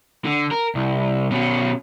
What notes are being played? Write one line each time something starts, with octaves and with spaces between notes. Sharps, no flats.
D3
A#4
C2
B2 C#4